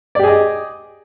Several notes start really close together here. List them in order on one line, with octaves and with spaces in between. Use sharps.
D5 G4 G#4 D#5